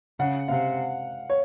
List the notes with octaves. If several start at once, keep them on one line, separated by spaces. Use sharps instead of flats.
C#3 F#5
C3 F5
C#5